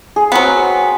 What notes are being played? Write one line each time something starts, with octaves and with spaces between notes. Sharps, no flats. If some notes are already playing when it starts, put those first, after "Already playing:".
G#4
F#3 B3 C4